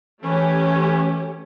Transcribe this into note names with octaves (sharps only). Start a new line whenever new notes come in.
E3 A3 C#4 G4